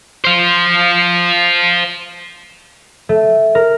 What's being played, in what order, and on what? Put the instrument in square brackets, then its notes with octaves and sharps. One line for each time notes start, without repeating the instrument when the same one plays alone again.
[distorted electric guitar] C5 F5
[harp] A3
A#4